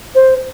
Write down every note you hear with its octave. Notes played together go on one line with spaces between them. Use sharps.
C5